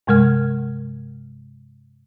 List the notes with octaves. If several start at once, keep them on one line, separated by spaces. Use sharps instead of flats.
G2 C3 G#3 A#4 F6 G#6